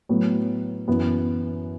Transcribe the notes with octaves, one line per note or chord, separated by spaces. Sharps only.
A2 F#3 B3
F#2 E3 B3